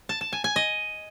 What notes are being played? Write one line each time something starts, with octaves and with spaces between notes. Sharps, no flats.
A5
A5
G#5
G#5
D#5